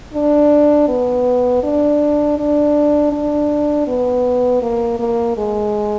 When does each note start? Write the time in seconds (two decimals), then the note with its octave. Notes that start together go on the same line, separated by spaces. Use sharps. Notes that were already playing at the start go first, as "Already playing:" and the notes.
0.14 D4
0.88 B3
1.63 D4
2.38 D4
3.12 D4
3.88 B3
4.62 A#3
4.99 A#3
5.37 G#3